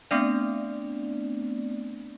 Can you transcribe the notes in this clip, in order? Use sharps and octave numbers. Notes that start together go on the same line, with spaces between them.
A3 B3 C4 D4 D5